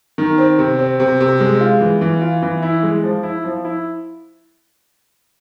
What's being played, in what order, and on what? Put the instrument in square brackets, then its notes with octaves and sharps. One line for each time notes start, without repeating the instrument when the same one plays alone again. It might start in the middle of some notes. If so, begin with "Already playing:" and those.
[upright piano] D#3
C4
C3
C4
C3
C3
G#3
F4
E3
E3
F4
E3
E4
G#3
F3
E4
F3
E4